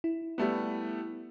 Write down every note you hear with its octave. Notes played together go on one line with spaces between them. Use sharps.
E4
G3 A3 B3